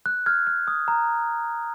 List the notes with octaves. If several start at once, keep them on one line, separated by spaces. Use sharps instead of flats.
F#6
F6 G#6
F6
D#6
A#5